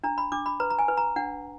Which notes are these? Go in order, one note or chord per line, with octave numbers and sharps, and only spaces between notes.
D4 A#5
B5
D4 D6
B5
B4 A#5
A#5
G#5
B4
A#5
D4 F#5